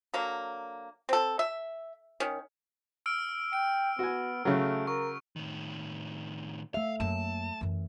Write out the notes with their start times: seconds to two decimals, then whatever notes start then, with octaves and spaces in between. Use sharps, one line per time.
0.14 D3 F#3 A#3
1.09 C4 A4
1.39 E5
2.20 D#3 C#4
3.06 E6 F6 D7
3.53 G5 D7
3.99 B3 F#4 G#5
4.45 C#3 F#3 A3
4.87 A#4 C#6
5.36 A2 D#3
6.74 A3 E5 F5
7.00 F#2 A#3 A5
7.61 F#2 E3